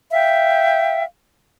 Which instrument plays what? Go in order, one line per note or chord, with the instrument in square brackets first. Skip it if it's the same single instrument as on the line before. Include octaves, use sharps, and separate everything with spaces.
[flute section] E5 F5 G5